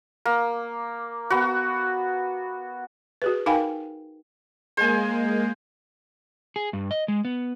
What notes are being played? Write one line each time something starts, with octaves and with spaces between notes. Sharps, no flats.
A#3
B3 F#4
F#4 G#4 B4
D#4 A#4 F5 G5 G#5 B5
G#3 A#3 C5 G#5
G#4
G2
D#5
G#3
B3